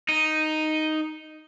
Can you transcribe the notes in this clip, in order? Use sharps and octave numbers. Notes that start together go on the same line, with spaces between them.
D#4